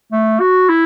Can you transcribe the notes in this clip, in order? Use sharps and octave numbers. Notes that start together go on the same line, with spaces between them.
A3
F#4
E4